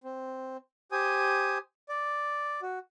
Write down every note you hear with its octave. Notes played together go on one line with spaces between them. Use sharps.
C4
G4 C5 G#5 D#6
D5
F#4